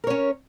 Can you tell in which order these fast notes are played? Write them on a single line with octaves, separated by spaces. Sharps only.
A#4 C#5 C#4